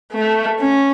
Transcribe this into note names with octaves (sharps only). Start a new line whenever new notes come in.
A3
C#4